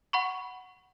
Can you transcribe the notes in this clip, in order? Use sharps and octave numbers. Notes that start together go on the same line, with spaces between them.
F#5 B5 C#6